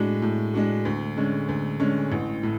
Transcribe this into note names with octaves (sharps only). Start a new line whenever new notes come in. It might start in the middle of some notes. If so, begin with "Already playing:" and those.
Already playing: A2 G#3 D4 F#4
A2
G#3 D4 F#4
D2
D3 G#3 C#4
D2
D3 G#3 C#4
A1
A2